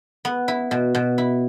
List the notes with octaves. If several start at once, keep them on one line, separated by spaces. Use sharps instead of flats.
B3
E4
B2
B2
E4